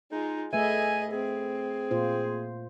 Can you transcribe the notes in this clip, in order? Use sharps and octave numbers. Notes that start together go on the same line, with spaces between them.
G#3 D#4 F4
A3 G#4 B4 D#5 E5 G#5
C4 G#4
A#2 F4 C5